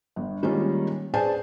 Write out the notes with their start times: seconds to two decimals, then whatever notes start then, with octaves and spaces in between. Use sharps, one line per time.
0.16 G1
0.43 D#3 G3 G#3 A#3 C#4 F4
1.14 G#4 B4 C5 D5 G#5 A5